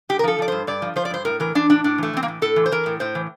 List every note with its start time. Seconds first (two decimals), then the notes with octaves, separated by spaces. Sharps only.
0.09 G2 G4
0.19 A#4
0.24 F3 A4
0.38 F3 D5
0.48 G2 C5
0.67 G2 D5
0.82 F3
0.96 F3 C5
1.05 D5
1.10 G2 C5
1.25 A2 A#4
1.40 E3 A#4
1.55 E3 D4
1.69 A2 D4
1.84 A2 D4
1.98 E3 A3
2.13 E3 C4
2.23 A#3
2.28 A2
2.42 A2 A4
2.56 E3
2.66 C5
2.72 E3 A#4
2.86 A2
3.00 A2 C5
3.15 E3